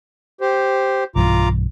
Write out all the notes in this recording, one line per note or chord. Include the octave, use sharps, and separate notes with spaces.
G4 C5
B1 G2 E3 F4 A#5 D6